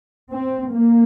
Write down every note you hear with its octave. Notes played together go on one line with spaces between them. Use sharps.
C4
A#3